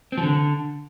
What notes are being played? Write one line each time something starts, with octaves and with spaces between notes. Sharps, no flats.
C4
F3
D3